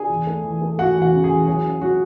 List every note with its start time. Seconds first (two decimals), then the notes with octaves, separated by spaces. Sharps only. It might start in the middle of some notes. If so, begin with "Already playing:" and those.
Already playing: D4 G#4 G#5
0.09 E2
0.27 A3
0.44 E3
0.62 A3
0.78 A3 F#4 F#5
0.95 E2
1.01 F#4 F#5
1.13 C#3
1.24 G#4
1.30 E3
1.47 F#3 G#4
1.65 C#4
1.82 F#3 F#4